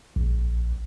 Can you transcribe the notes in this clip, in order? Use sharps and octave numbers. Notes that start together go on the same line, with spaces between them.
A#1